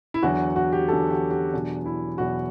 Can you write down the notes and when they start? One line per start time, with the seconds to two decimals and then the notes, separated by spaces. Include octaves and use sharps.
0.14 E4
0.23 E2 D3 F#3 F#4
0.56 F#4
0.73 G4
0.88 E2 D3 F#3 A4
1.10 G4
1.31 G4
1.54 E2 B2 F#3 D4
1.86 E4
2.18 E2 B2 F#3 F#4